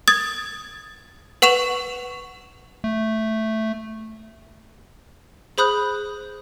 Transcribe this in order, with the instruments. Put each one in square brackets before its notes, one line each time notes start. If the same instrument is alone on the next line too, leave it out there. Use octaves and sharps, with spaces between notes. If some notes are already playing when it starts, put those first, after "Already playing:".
[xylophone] D#6 G#6 A6
B4 F#5 C#6 E7 F7
[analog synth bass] A3
[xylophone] G#4 C5 B5 D#6 F#6 G6